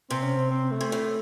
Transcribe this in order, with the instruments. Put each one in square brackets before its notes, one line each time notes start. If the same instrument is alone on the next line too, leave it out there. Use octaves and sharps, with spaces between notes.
[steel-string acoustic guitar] C3 [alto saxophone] C4
[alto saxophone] C#4
C4
C4
A3
[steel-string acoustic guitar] C3
A2